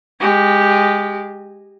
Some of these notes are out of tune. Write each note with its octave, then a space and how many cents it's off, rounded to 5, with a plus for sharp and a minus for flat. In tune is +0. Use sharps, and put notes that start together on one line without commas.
G#3 -15 G4 +0